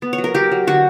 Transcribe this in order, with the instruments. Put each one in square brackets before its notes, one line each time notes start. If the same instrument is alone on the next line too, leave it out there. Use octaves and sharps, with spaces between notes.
[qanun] B3
C#5
F#3
A#4
F#3 G4
F#3
D3 F#4